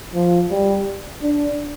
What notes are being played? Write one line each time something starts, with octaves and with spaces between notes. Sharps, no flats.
F3
G3
D4